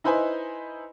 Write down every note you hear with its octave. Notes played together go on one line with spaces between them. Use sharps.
D#4 E4 B4 C5 D#5 G#5